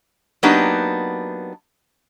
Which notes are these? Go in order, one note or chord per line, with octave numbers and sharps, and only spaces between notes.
F#3 A#3 B3 D4 D#4 G4